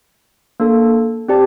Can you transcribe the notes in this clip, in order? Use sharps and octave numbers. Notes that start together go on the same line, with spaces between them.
A#3 D4 A4
C4 G4 D5 A5